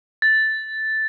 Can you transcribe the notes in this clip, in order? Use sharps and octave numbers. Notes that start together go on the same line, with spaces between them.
A6